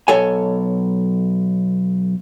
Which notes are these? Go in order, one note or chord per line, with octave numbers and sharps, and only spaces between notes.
B1 A4 C#5 G#5